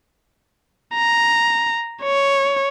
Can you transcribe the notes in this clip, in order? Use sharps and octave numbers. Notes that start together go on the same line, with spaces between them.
A#5
C#5